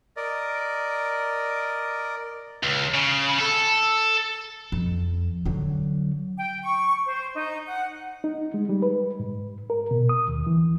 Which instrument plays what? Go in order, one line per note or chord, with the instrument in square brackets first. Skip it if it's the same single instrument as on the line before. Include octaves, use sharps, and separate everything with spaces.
[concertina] A#4 D5 D#5
[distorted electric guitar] C#2
C#3
A4
[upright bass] F2
D3 F#3
[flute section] G5
C#6
C5
D#4
F#5
[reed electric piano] D#4
G#3
G3
B4
G#2
A#4
B2
D#6
D#2
E3